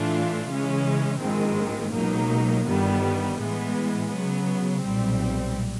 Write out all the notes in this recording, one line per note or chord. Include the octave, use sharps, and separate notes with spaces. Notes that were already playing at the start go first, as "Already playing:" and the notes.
Already playing: A2 E3 A3 D4 F4
C#3 E3 G#3 C#4
A#1 G#2 D#3 G#3 C4
C#2 B2 F#3 A#3 D#4
G1 G2 D#3 G3 B3
A2 E3 G#3 B3
C#3 F#3 B3
B1 A#2 G3 C4